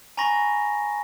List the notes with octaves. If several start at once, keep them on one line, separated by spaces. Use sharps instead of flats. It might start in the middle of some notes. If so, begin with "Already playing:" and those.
G#5 A#5 B5 C#6 A#6